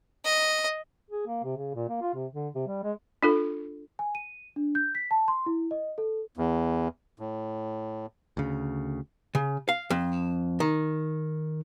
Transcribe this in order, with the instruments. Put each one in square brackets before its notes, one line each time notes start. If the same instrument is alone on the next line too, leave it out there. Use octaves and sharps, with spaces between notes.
[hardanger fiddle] D#5
[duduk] G#4
A#3
C3
C#3
A#2
A#3
F4
C3
D3
C3
G3
G#3
[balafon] D4 F4 A4
[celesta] G#5
D#7
D4
G6
B6
A5
C6
E4
D#5
A4
[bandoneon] E2
A2
[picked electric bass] D2 C#3
[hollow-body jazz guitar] C#3
F5
F2
D#3